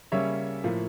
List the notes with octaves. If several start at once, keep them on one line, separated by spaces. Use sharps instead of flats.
C#3 G3 A#3 C#4 C#5 E5
A2 F3 A#3